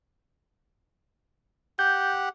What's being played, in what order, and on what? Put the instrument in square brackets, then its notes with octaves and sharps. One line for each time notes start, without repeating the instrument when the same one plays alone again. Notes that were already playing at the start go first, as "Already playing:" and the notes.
[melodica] G4 F#5 [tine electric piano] G6